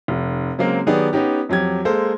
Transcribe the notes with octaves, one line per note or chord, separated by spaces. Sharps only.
F1
C#3 F#3 G#3 A#3 C4
D#3 F#3 B3 G4 G#4 D5
B3 C#4 D#4 G4
F2 F#3 G4 G#6
G#3 A#3 A4 C5